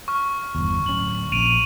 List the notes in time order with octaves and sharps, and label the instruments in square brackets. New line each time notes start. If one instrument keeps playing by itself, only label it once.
[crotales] C#6 F6
[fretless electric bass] G1 E2
[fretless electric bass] D1 C#4 [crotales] F#7
[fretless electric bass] A#1 C#4 [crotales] D7 D#7 F7